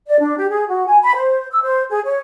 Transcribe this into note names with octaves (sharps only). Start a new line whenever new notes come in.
D5
D4
G4
G#4
F#4
G#5
B5
C5
E6
C5
G#4
C#5